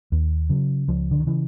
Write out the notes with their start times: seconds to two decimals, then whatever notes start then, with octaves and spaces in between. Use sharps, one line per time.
0.12 D#2
0.49 C#3 F#3
0.88 C#2 F3
1.11 D3
1.20 D#3
1.26 C#3 E3